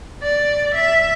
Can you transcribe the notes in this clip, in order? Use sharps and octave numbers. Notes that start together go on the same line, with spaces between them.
D5
E5